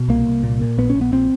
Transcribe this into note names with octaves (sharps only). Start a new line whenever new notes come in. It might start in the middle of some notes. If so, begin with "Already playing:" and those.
Already playing: B2
C2 A#3
C2
A#2
A#2
A#1 B3
C#4
A#1
B3
A#2 C4